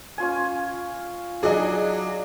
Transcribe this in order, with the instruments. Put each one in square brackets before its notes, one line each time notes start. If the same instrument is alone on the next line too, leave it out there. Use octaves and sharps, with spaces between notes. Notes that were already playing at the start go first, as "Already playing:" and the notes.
[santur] C#4 F4 G#5
[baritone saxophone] F#3 [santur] D4 D#4 [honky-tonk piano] G#4 D#5